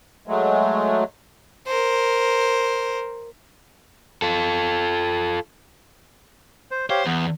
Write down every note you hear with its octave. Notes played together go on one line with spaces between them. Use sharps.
F#3 G#3 A3
A#4 C5
F4 A4
C5
G4 C5 C#5 F5
E2 B3